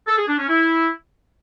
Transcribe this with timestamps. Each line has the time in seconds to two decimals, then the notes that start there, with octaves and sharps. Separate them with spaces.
0.07 A4
0.18 G#4
0.28 D4
0.38 C#4
0.49 E4